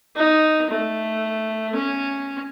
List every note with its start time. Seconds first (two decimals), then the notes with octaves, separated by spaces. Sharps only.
0.16 D#4
0.70 A3
1.75 C#4